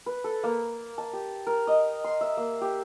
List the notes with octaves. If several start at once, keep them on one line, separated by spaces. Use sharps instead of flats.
B4
A4
A#3
A5
G4
A#4
D#5
C6
E5
A#3
G4